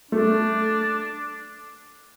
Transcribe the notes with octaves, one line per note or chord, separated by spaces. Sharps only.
A3 D4